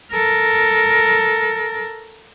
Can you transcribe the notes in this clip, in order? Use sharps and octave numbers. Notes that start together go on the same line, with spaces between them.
A4 A#4